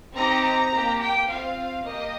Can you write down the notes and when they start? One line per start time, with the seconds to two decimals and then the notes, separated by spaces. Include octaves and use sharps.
0.14 C4 D#4 G4 A#5
0.42 A#5
0.70 A#3 G4
0.99 G5
1.28 C4 F4 F5
1.83 A#3 G4 D#5